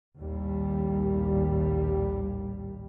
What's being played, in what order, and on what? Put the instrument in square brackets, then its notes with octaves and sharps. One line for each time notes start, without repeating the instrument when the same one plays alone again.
[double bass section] A#1 D#2 A2 G3